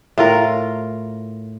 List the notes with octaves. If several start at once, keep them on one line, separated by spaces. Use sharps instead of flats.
A2 F4 A#4